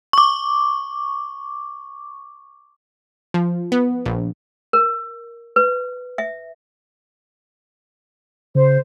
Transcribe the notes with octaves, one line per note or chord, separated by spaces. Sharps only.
C#6 D6
F3
B3
A#1
A#4
B4
E5
C#3 C5